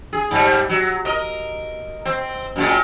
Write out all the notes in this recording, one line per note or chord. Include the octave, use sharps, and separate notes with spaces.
G#4
G#2 G3
F#3
A#4 D#5
C4
F#2 A#2 G#3